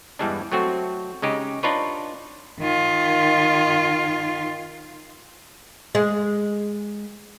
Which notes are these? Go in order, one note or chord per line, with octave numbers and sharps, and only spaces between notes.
E2 G2 E3 G3 G#3 D4
F#3 A3 C4 F#4
C#3 G#3 D#4 G4 G#4
D4 D#4 F4 B4 C#5
D#3 F4
G#3